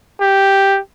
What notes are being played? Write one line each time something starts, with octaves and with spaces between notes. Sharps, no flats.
G4